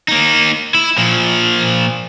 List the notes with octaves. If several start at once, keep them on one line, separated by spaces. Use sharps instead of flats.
A#3 D#4
E4
A#2 F3